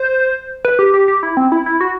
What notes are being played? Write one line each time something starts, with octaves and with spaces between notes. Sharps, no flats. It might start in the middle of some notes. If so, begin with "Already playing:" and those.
Already playing: C5
B4
G4
G4
G4
E4
C4
E4
E4
F#4